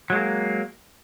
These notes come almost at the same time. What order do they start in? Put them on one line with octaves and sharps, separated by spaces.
F#3 G#3 A#3